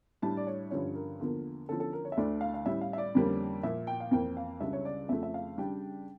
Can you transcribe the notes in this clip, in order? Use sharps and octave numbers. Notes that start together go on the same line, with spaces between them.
A2 G3 D4 A5
D5
C#5
G2 D3 F3 C#4 C#5
A#4
E2 D3 F3 A#3
E2 D3 F3 C#4 A4
A4
A#4
C#5
E5
D2 D3 A3 D4 D5
F5
F5
A2 G3 C#4 E5
F5
E5
D5
F2 D3 G3 A#3 C#4
A#2 F3 A#3 E5
G5
F5
F2 E3 A#3 G5
F5
C#2 C#3 G3 D4 E5
C#5
D5
F2 C#3 F3 A3 E5
E5
F5
C#3 G3 D4 G5